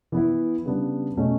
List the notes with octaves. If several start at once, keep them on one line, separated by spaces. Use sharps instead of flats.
E3 B3 E4
C#3 G3 B3 D4
B2 A3 C#4